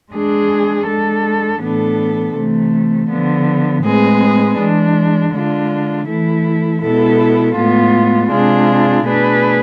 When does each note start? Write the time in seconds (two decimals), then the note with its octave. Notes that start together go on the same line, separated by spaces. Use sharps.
0.12 G#3 D4 G#4
0.87 G#3 D4 A4
1.61 A2 E3 B3 D4 A4
2.35 C3 E3 A3
3.10 D3 F3 B3
3.84 A2 G#3 C4 G#4 B4
4.58 E3 G#3 D4
5.33 D3 G#3 D4 F4
6.07 E3 A3 E4 A4
6.82 B2 G#3 B3 E4 A4
7.56 A2 G#3 B3 F4
8.30 C3 G#3 D4 F4 G#4
9.04 B2 A3 D4 G#4 B4